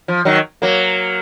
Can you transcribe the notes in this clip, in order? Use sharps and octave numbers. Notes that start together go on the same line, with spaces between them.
F3
D#3 F#3
F#3 A#3